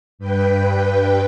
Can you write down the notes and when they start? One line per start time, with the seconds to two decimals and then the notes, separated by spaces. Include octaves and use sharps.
0.19 G2 B4 G5